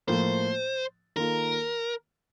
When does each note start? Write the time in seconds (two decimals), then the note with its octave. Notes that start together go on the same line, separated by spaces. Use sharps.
0.07 A2 F3 A#3 C5
1.16 D#3 A#3 F4 A4 A#4